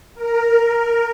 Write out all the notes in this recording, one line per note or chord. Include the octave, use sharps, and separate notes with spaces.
A#4